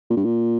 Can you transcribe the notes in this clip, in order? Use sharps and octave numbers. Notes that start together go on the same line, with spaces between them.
A#2
G2
A#2